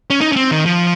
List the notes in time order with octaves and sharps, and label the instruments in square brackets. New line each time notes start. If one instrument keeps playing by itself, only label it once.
[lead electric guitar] C#4
D#4
C#4
C4
D#3
F3